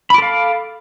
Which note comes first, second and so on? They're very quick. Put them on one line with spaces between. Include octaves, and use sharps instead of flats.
B5 D6 A4 F5